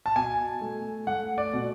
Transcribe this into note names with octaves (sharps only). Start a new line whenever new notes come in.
A5
B2 G#5
A3
A3 F#5
D5
B2